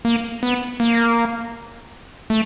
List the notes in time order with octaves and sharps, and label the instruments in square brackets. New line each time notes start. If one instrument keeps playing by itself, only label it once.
[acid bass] A#3
B3
A#3
A3